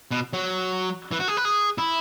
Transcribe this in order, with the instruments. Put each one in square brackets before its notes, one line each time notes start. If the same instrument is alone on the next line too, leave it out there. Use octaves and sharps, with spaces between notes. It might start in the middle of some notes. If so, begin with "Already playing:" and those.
[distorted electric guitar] B2
F#3
E3
F#4
G#4
B4
G#4
E4